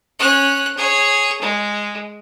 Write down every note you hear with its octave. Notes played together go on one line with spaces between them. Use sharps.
C#4 F#6
G#4 C#5
G#3